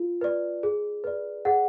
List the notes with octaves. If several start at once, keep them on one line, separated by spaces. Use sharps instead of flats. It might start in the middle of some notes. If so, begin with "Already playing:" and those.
Already playing: F4
B4 D5
G#4
B4 D5
G#4 F#5